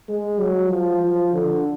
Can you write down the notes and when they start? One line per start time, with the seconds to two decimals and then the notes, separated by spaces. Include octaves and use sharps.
0.08 G#3
0.40 F#3
0.70 F3
1.02 F3
1.33 D3